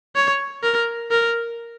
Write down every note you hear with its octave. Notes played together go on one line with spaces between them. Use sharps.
C#5
A#4
A#4